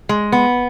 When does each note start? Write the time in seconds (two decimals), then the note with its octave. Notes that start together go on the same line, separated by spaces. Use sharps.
0.09 G#3
0.32 B3